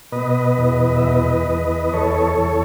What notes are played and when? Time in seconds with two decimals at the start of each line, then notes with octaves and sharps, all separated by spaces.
0.12 B2 B4 D#5
0.58 E2
0.97 E5
1.02 E2 B4 D#5
1.48 E2
1.93 E2 A4 C#5
2.38 E2